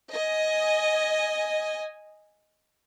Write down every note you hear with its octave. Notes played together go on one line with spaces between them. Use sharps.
D#5 G#5